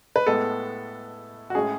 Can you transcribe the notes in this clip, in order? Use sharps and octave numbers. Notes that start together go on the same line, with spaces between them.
B4
A2 G#3 B3 A4
F#4
A2 G#3 C#4 G#4